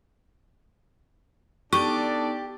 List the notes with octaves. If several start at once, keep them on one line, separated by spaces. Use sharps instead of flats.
B3 D4 D#4 G4 A4 D5 A5 C#6